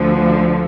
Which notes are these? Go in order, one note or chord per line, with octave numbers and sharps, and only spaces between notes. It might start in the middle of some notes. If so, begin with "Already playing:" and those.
Already playing: D2 D3 F3